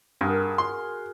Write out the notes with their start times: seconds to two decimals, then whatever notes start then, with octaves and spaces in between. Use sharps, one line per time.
0.21 G2 F#4 G#4 A#4
0.58 C6